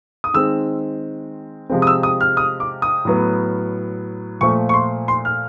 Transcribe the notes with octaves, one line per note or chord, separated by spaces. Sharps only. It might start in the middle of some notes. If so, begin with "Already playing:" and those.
D#6
D#3 G#3 C4 E6
C3 F3 G#3 C4
D#6
E6
D#6
F6
D#6
D6
D#6
A2 F#3 B3
A#2 F3 A3 C#6
C#6
C6
C6
F6